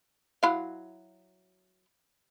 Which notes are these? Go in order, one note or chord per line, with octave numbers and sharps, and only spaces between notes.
F#3 E4 F5